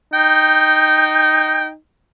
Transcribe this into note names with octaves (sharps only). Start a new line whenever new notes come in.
D#4 G5